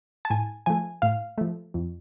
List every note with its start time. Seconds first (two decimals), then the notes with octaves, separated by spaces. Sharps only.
0.25 A5
0.30 A2 G#5
0.66 F3 A3 G#5
1.02 A2 F5
1.38 F3 A3
1.74 F2